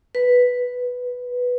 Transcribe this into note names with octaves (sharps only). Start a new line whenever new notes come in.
B4